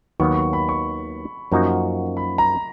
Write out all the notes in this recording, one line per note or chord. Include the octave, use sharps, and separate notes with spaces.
D#2 D#3 F#3 B3 C#6
C#6
B5
C#6
F#2 F3 A#3 D#4 F#4
B5
A#5